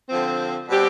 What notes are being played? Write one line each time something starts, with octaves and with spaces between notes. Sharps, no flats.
D3 F3 C4
B2 G3 C4 G4